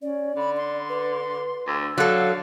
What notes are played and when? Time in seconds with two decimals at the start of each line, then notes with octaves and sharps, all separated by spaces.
0.02 C#4 D5
0.37 D3 B5
0.57 C6
0.89 B4
1.68 D2 E6
1.98 D3 F#3 A4 F5